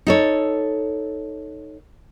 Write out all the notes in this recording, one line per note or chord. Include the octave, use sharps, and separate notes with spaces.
D#4 A4 C#5